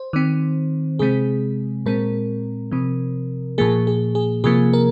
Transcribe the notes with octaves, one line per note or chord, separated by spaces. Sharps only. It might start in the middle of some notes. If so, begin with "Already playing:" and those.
Already playing: C5
D#3 C4
C3 G#3 C4 G#4
A#2 G#3 C4 A#4
C3 F3 C4
A#2 F3 A#3 G#4
G#4
G#4
C3 F3 A#3 G#4
A#4